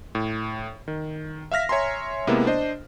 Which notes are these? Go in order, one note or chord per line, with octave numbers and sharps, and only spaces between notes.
A2
D#3
E5 F5 F6 A#6 B6
C#5 E5 G#5 A#5 C6
C3 G#3 A#3 B3 E4
D4 C5 D#5